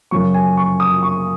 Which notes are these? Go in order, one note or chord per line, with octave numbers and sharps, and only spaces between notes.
F#2 C#3 F#3 C#6
G#5
C#6
D#6
C#6